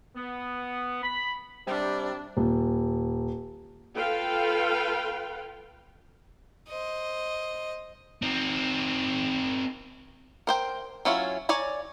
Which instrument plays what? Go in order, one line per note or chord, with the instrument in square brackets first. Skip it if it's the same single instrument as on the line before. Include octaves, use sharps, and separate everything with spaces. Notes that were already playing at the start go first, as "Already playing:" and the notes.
[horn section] B3
B5
[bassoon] C3 [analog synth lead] G3 [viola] D4
[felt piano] D#1
[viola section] F4 A4 B4 F5 G5
[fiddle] C5 D#5
[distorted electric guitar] C4 D#4
[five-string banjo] A#4 C5 G5
F#3 C#4 E4 F4
C#5 D5 G#5 A#5